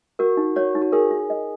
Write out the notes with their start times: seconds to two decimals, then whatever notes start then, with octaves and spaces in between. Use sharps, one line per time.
0.19 F#4 A#4
0.37 D#4
0.56 F#4 C#5
0.75 D#4
0.82 F#4
0.92 G#4 A#4
1.11 F4
1.30 D#5